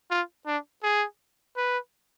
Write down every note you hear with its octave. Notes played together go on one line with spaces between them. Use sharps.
F4
D4
G#4
B4